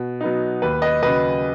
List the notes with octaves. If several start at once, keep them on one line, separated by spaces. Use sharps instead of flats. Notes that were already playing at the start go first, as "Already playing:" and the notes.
Already playing: B2
F#3 B3 D#4
D#2 B4
B4 D#5
C#3 F#3 B4 D#5